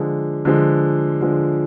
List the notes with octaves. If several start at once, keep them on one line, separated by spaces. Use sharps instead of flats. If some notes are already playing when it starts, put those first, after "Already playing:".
Already playing: D3 F3 G#3
D3 F3 G#3
D3 F3 G#3